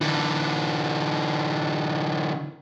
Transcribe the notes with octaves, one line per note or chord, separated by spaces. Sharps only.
D3 E3